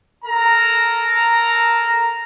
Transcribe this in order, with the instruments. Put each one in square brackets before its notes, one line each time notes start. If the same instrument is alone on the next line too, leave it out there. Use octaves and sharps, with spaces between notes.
[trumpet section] A4 A#4 A#5